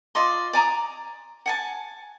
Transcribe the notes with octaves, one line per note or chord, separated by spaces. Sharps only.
F4 D5 D#5 C6
D5 G#5 A#5 D#6
F#5 G#5 A5